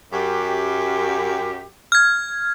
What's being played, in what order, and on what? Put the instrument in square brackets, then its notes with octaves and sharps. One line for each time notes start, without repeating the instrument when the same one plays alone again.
[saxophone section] F#2 G4
[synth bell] F6 G#6